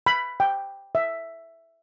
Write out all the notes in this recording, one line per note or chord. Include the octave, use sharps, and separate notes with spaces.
B5
G5
E5